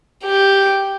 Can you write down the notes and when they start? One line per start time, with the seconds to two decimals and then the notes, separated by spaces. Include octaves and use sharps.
0.24 G4